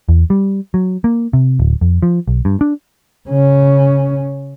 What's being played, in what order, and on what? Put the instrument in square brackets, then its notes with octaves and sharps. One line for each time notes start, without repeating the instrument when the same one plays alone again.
[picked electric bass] E2
G3
F#3
A#3
C3
D1
F2
F3
B1
G2
D4
[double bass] C#3 C#4